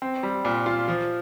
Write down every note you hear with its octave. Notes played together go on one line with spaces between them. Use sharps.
C4
G3
A#2
F4
F3